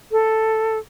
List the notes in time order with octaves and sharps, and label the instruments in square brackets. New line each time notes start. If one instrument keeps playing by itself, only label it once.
[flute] A4